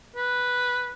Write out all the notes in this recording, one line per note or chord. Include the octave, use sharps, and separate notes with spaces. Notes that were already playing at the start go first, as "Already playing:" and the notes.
B4